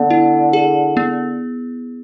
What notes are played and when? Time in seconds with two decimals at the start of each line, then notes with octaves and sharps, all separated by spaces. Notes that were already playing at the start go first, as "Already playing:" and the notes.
Already playing: D3 B3
0.10 E4
0.53 G#4
0.97 B3